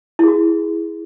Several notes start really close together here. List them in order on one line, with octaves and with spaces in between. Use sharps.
E4 G#4 F#4